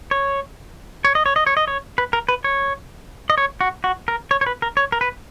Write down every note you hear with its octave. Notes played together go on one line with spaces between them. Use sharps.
C#5
C#5
D#5
C#5
D#5
C#5
D#5
C#5
B4
A#4
B4
C#5
D#5
C#5
F#4
F#4
A#4
C#5
C#5
B4
A#4
C#5
A#4
B4